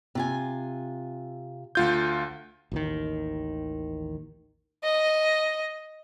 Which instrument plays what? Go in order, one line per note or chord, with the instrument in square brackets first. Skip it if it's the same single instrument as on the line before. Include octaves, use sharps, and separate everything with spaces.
[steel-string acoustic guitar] C3 F4 G#5
[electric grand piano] D2 F4 G6
[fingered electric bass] A1 D#2 D#3
[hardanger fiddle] D#5